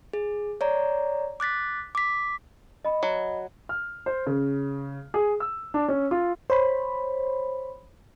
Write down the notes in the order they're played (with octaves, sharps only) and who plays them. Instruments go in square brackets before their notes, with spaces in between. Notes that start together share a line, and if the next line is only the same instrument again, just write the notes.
[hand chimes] G#4
C#5 D5 A#5
D6 F#6 A6 B6
D6 B6
[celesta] D#5 B5
[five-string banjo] F#3
[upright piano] F6
C5
C#3
G#4
E6
D4
C#4
F4
[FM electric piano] C5 C#5 B5